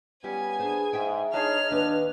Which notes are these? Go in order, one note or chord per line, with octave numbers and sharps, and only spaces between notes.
G3 B3 C#4 G4 G#5
D4 G#4 C5
G#2 E5 G5
D4 D#4 G#4 C#5 D#5 F6
D#2 D4 B4